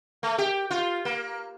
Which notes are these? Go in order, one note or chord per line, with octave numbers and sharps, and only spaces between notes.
A3
G4
F4
A#3